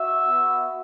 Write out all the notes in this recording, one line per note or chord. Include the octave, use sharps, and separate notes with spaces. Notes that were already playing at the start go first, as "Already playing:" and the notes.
Already playing: F#4 E5
B3 F#4